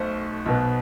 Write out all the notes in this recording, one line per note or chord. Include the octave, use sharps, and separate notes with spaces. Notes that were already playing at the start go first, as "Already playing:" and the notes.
Already playing: B1 B2 A3 C5
B1 B2 B3